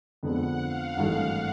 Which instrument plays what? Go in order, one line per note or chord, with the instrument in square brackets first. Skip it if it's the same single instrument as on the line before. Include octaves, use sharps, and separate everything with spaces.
[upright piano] F2 D3 F3 G#3 B3 [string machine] F#5
[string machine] F5
[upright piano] G#1 G2 E3 A3